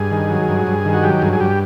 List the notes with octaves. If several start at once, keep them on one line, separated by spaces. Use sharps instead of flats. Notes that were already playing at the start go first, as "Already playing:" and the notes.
Already playing: G2 G#4
D#3
F#3
G2
G2
D#3
F#4
F#3 G4
G2 G#4
G#4
G2 G4